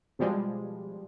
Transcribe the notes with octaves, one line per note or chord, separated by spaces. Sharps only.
B2 F3 G3 G#3